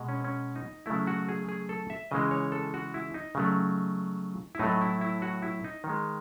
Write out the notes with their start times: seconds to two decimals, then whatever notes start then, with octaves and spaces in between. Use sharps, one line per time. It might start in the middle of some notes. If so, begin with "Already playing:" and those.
Already playing: B2 G#3
0.09 C#4
0.24 C#4
0.56 D#4
0.86 C#3 F#3 A3 E4
1.07 F#4
1.29 G#4
1.49 G#4
1.69 A4
1.90 E5
2.11 C#3 E3 G#3 D#5
2.31 C#5
2.52 A4
2.74 F#4
2.94 E4
3.14 D#4
3.35 C#3 F#3 A3
4.55 E4
4.59 A2 F#3 A3 D#4
4.81 E4
5.01 E4
5.22 F#4
5.42 E4
5.64 D#4
5.84 D#3
5.89 G#3